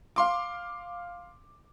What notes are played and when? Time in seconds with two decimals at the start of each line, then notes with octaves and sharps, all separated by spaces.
0.16 F5 C6 D6